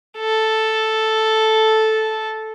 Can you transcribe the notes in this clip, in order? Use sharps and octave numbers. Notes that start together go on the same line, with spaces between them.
A4